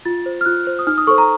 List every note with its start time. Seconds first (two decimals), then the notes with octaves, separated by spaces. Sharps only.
0.05 F4 A6
0.26 C5
0.41 F6
0.45 F4 F#6
0.67 C5
0.79 D#6
0.87 D#4 F6
0.98 D#6
1.07 A4 C5 C#6
1.18 A#5